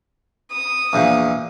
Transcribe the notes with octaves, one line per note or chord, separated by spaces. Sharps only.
D#6
A#1 E2 A#2